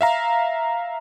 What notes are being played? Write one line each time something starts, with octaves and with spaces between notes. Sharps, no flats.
E5 F5 A#5